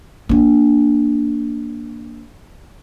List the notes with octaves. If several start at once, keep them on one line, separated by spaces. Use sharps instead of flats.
A#3 D4